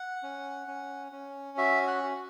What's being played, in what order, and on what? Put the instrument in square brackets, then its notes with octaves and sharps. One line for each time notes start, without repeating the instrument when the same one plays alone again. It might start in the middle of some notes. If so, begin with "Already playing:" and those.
Already playing: [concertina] F#5
C#4
C#4
C#4
F#4 E5
F#5
F#4